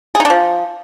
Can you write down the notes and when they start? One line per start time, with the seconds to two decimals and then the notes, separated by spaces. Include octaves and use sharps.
0.15 G#4
0.20 D#4
0.25 D4
0.30 F3